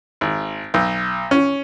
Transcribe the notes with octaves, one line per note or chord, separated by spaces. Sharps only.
G#1
B1
C#4